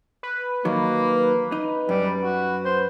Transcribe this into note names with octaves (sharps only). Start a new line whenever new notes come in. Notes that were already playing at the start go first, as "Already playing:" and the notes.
B4
D#3 F#3 A#3
D#4
F#2 G3
F#4
C5